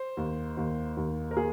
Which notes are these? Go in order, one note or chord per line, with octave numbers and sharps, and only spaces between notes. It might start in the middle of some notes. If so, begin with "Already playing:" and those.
Already playing: C5
D#2
D#2
D#2
A#4
A#3 G#4